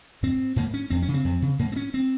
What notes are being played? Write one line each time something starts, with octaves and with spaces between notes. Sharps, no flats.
G#2 C4
G#2 A#3
C#4
F2 C4
C#4
C#3
C4
F2
C#3
G#2 A#3
C4
C#4
C4